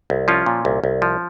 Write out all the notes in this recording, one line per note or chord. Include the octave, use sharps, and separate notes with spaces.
C2
F3 C#4 F4
A#2
C2
C2
F3